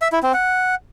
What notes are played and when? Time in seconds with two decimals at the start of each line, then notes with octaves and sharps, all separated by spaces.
0.02 E5
0.12 E4
0.23 C4
0.34 F#5